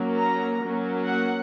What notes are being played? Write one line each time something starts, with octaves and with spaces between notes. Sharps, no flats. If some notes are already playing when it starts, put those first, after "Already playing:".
Already playing: F#3 A#3 C#4
A#5
F#3 A#3 C#4
F#5